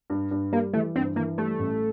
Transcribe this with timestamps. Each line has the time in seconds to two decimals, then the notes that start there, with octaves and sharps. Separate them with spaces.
0.10 G2
0.31 G2
0.53 G3 A#3
0.73 E3 A3
0.96 G2 C4
1.16 E3 A#3
1.38 G3 A3
1.59 A1